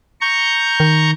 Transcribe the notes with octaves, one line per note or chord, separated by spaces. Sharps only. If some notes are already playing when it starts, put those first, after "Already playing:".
A#5 C#6 G6
D#3